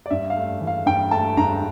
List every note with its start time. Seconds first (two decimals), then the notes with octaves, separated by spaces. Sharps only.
0.06 D5
0.10 G2 E5
0.30 F5
0.36 A3
0.61 E3
0.67 F5
0.86 G2 G5
1.11 A3 A5
1.37 G2 A#5